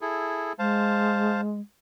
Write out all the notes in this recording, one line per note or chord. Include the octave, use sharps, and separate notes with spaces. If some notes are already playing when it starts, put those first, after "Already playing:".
E4 G#4 A4
G#3 C5 F5 A5